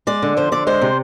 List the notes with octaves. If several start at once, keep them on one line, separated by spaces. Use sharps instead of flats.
G#3 D5
D3
F3 C5
D3 D5
G#3 C5
C3